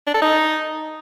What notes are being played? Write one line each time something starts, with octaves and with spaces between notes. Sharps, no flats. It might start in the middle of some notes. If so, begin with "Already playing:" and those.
D4
A4
D#4